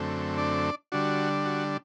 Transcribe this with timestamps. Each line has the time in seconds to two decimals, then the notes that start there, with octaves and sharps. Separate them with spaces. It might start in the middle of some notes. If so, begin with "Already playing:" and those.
Already playing: F#2 D3 A3 C4
0.38 D4 D5
0.92 D3 G3 D4 F#4
1.45 F#4